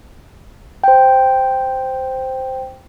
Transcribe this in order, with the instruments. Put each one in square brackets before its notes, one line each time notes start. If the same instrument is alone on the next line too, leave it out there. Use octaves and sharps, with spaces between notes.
[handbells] C5 G5